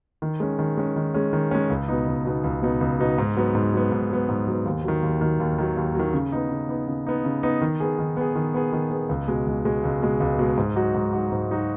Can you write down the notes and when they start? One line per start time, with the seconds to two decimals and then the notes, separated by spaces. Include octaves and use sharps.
0.22 D#3
0.40 G#3 C#4
0.59 D#3
0.77 G#3 C#4
0.96 D#3
1.14 G#3 C#4
1.33 D#3
1.51 G#3 C#4
1.70 C#2
1.88 B2 B3 D#4
2.07 C#2
2.25 B2 B3 D#4
2.44 C#2
2.62 B2 B3 D#4
2.81 C#2
2.99 B2 B3 D#4
3.18 G#2
3.36 F#3 B3
3.55 G#2
3.73 F#3 B3
3.92 G#2
4.10 F#3 B3
4.29 G#2
4.47 F#3 B3
4.66 D#2
4.84 D#3 F#3
5.03 D#2
5.21 D#3 F#3
5.40 D#2
5.58 D#3 F#3
5.77 D#2
5.95 D#3 F#3
6.13 C#3
6.32 B3 D#4
6.50 C#3
6.69 B3 D#4
6.88 C#3
7.07 B3 D#4
7.25 C#3
7.43 B3 D#4
7.62 D#3
7.80 B3 G#4
7.99 D#3
8.17 B3 G#4
8.36 D#3
8.54 B3 G#4
8.73 D#3
8.91 B3 G#4
9.09 C#2
9.28 B2 G#3
9.47 C#2
9.65 B2 G#3
9.84 C#2
10.02 B2 G#3
10.20 C#2
10.39 B2 G#3
10.57 G#2
10.76 F#3 D#4 F#4
10.94 G#2
11.13 F#3 D#4 F#4
11.32 G#2
11.50 F#3 D#4 F#4